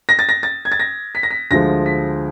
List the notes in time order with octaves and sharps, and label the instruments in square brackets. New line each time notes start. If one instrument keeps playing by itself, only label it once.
[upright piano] A#6
A6
A#6
A6
G#6
A6
A#6
B6
A#6
B6
D2 D3 F3 G#3 A#6
B6